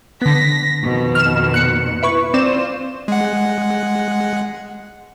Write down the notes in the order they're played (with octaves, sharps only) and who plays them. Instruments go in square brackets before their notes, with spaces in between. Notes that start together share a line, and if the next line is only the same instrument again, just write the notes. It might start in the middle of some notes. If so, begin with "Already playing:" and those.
[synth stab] D3 B3 [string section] A#6 B6
[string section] F2 B2 D#3
[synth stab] F6 E7
F#6 C#7
E4 B4 C#6
[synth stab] C4 D5 E7 [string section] F4 C5
[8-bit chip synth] G#3 F#5